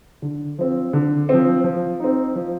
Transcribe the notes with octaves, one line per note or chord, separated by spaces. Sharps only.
D3
F3 C4
D3
F3 C4
F3
C4 D#4
F3